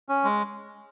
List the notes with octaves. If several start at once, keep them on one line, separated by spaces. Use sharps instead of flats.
C#4
G#3